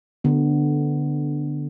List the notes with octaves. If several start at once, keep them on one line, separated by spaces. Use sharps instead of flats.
D3 B3